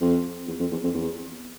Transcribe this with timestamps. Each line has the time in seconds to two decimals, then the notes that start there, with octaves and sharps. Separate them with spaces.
0.01 F2
0.48 E2
0.60 F2
0.72 E2
0.84 F2
0.94 E2